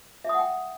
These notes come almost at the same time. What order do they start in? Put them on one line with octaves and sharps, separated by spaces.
E5 D#6 F#5 G5